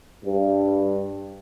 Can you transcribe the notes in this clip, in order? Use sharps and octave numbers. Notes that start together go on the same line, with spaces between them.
G2